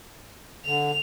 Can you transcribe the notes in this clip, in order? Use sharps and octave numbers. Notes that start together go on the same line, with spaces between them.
D3 F7